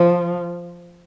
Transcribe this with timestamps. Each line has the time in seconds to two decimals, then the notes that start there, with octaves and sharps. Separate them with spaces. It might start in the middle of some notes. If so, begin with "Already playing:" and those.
Already playing: F3